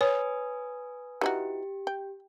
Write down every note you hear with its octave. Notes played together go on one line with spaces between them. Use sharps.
B4 C#5 G#5 D#6
E3 D#4 F#4 G4
G5